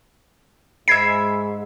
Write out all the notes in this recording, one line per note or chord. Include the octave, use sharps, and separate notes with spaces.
G#2 G#3 E5 B5 G#6 C7